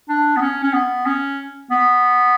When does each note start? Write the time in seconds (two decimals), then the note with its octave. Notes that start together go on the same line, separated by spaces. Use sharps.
0.09 D4
0.37 B3
0.41 C#4
0.63 C#4
0.74 B3
1.06 C#4
1.71 B3